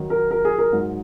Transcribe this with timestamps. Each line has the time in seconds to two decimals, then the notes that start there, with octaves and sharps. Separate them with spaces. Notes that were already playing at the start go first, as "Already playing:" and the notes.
Already playing: D#3 F#3 D#4
0.10 A#4
0.31 A#4
0.45 G#4
0.58 A#4
0.72 G#2 F#3 D#4